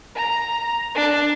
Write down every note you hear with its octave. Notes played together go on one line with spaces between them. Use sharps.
A#5
D4